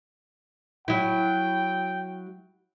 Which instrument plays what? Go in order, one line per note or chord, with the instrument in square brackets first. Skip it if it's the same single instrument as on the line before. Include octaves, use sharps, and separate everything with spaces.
[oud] F#3 E4 [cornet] G5